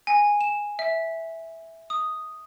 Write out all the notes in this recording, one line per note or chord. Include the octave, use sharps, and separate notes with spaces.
G#5
E7
E5
D#6